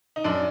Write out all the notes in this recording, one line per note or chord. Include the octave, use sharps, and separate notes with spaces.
D#4
F#2 D4